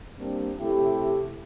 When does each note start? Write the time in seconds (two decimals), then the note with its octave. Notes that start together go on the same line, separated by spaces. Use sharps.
0.19 G3 A#3 C4 D4
0.59 C3 A3 E4 G4